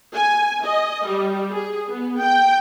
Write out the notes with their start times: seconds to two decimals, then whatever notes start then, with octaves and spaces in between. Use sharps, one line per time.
0.14 G#5
0.63 D#5
1.06 G3
1.51 G#4
1.92 B3
2.21 G5